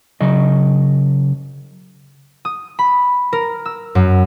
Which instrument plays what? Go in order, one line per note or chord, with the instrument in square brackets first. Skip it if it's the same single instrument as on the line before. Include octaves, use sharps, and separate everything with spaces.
[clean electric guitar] C#3 F#3 D#5
[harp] D#6
B5
A#4
E6
F#2